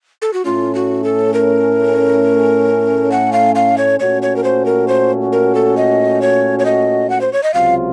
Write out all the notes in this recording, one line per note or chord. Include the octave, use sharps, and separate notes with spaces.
A4
F#4
A2 A3 C#4 F4
F#4
A4
A#4
F#5
F5
F5
C#5
A#2 A3 C#4 F#4 C#5
C#5
A#4
C5
A#4
C5
A#4
A4
D#5
C#5
C#5
D#5
F#5
C5
C#5
D#5
C#2 C3 F#3 C4 F4 F5